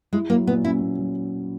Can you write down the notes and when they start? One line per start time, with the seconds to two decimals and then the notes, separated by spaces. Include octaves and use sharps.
0.13 G#3 E4
0.30 F#3 A#3
0.47 A#2 B3
0.64 C#4 E4
0.81 A#2
0.99 F#3